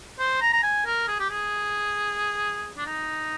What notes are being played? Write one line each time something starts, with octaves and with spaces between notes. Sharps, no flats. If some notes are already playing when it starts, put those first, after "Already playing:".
C5
A#5
A#5
G#5
A#4
G#4
G4
G#4
D4
D#4